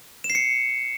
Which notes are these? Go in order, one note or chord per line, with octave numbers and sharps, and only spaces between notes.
E7
C7
C#7